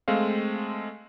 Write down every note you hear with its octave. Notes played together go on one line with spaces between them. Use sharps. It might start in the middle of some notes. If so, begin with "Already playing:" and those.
G#3 A3 C4 F5